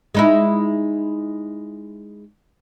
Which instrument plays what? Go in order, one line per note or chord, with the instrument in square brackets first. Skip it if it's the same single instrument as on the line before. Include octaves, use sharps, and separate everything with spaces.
[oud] G#3 D#4 E4